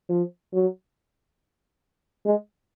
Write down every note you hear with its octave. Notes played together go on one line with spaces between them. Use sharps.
F3
F#3
G#3